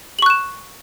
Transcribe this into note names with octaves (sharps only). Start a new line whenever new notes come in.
C#6 F#6 E7 F#7